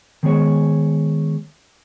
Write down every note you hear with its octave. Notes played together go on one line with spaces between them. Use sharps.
D#3 G#3 B3 G#4 C#5